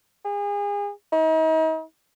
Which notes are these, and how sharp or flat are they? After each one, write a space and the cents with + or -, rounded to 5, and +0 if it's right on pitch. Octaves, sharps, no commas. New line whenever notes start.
G#4 -35
D#4 +40